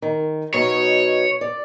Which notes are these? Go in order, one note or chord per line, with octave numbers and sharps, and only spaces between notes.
D#3
B2 F#3 D#4 C#5
D5